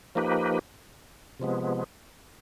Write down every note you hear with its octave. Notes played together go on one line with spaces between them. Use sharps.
F3 A#3 D#4 G4 B4
C3 F3 G#3 B3